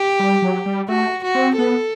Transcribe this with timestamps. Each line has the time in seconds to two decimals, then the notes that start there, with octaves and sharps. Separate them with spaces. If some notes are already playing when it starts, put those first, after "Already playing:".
Already playing: G4
0.20 G3
0.42 F#3
0.66 G3
0.88 A3 F#4
1.24 F#4
1.35 C4
1.58 B3 A4